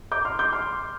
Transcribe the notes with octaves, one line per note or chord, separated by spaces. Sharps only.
D6 G6
C6 F6
D6 G6
C6 F6